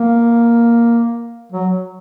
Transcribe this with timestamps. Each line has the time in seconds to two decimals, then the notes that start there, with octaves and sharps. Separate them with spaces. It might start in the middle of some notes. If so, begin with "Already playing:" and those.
Already playing: A#3
1.52 F#3